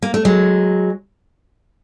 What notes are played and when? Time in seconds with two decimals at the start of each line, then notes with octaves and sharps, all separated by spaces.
0.02 A#3
0.14 A3
0.25 F#3 G#3